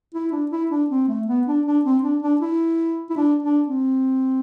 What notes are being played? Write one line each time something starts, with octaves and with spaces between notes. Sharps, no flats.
E4
D4
E4
D4
C4
A3
B3
D4
D4
C4
D4
D4
E4
E4
D4
D4
C4